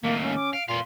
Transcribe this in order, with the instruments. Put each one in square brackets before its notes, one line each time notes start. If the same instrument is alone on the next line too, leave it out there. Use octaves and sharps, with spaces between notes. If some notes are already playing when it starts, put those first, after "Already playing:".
[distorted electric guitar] D#2 A2 [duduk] A#3 [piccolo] F5
[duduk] C#4
[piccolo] D6
[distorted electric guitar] F5 [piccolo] D7
[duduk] A#2 [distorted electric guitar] B3 F5 [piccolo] C6